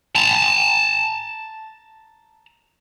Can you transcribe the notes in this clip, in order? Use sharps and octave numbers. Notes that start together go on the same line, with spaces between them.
A5 A#5